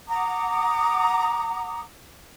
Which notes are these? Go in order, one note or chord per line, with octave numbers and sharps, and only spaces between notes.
F#5 A#5 D6 D#6